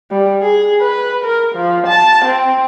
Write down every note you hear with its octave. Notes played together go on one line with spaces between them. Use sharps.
G3
G#4
B4
A#4
F3
A5
C4